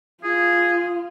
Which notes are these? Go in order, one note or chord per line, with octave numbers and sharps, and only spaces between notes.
F4 G#4